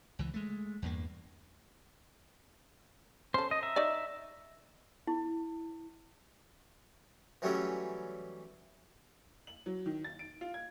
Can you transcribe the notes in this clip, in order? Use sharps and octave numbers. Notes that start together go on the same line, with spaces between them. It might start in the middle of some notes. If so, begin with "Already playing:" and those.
C#2 E3
G#3 A3
E2 G2 A#3
C#4 A4 C5
D#5
E5 A#5
D#4 C#5 D5
E4
E3 F#3 G3 A3 C#4 E4
F#7
F#3
D#3
A6
D7
F4
G#6